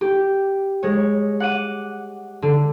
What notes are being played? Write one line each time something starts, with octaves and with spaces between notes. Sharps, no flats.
G4
G#3 C#5
F#5 D6 D#7
D3